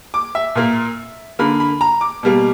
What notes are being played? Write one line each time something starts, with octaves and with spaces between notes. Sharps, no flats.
D6
E5
A#2 A#3
D3 A#3 B5
B5
A#5
D6
B2 G3 A#3